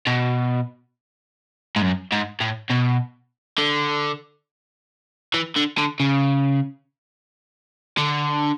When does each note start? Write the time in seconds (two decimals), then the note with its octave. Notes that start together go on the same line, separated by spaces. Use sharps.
0.07 B2
1.76 G#2
1.82 F#2
2.12 G#2
2.41 A2
2.70 B2
3.58 D3
5.34 E3
5.56 D3
5.78 D3
6.00 C#3
7.98 D3